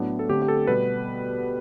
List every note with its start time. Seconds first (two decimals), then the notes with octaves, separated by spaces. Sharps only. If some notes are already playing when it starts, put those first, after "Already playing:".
Already playing: A2 F#3 B3 D4
0.19 A4
0.28 D3 A3 C4 G4
0.42 G4
0.48 A4
0.67 B2 G3 B3 B4